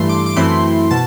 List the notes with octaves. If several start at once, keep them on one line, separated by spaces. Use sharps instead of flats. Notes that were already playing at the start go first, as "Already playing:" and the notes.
Already playing: G2 E3 A3 C6
D6
D6
F#2 E3 A3 C4 E4 C6
B2 A5